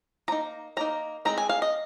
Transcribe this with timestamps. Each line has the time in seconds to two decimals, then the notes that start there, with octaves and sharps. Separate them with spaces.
0.28 F3 A#3 D#4 A#5
0.77 F3 A#3 D#4 A#5
1.25 G#3 C4 D#4 A#5
1.38 G#5
1.49 F5
1.62 D#5